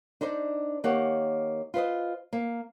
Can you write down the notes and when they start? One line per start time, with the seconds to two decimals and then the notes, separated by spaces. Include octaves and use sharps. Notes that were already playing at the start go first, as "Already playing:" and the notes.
0.21 D4 D#4 C5 D5
0.84 D#3 A#3 G4 C#5 F#5
1.74 F4 B4 C5 D#5
2.33 A#3